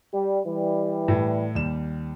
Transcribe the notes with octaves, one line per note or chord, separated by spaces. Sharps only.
G3
E3 G3
A2
D#2 G3 E7